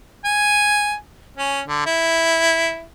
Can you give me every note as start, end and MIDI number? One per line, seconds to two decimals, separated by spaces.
0.25 0.95 80
1.37 1.62 61
1.67 1.82 50
1.86 2.84 64